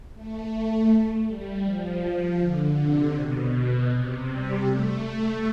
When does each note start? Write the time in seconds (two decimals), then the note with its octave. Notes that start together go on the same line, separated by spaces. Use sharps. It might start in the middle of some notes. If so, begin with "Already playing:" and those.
0.14 A3
1.26 G3
1.64 F3
2.39 D3
2.77 C3
3.14 B2
3.90 C3
4.28 G3
4.64 A3